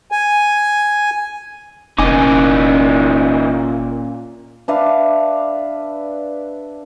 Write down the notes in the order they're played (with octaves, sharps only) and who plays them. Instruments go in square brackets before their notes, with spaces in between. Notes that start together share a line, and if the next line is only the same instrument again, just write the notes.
[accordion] G#5
[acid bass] F1 [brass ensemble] A#2 [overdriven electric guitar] E3 D#4 [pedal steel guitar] C#4 G#5 D6
[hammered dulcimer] D4 B4 E5 F5